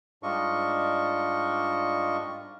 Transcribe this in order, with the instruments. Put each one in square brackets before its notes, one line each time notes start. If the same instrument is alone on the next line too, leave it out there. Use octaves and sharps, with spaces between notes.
[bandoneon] G#2 G3 D4 F4 D#5 C#6